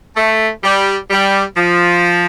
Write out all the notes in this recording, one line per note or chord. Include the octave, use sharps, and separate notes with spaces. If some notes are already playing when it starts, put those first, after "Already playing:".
A3
G3
G3
F3